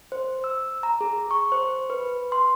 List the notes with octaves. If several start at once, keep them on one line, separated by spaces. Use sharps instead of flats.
C5
E6
A#5
G#4
C#6
C5
B4
C6